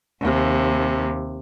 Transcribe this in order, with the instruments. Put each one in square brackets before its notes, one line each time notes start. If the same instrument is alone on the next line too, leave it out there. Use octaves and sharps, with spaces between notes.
[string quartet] D#2 C3